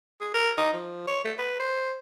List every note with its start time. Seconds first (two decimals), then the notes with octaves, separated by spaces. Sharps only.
0.21 G#4
0.34 A#4
0.58 D#4
0.73 F3
1.07 C#5
1.24 A3
1.38 B4
1.59 C5